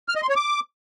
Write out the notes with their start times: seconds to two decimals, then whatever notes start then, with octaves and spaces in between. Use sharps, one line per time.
0.09 F6
0.15 D#5
0.22 C6
0.29 C#5
0.36 D6